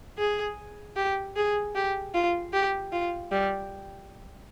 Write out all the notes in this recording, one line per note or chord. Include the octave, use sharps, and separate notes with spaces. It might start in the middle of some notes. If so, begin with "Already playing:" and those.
G#4
G4
G#4
G4
F4
G4
F4
G3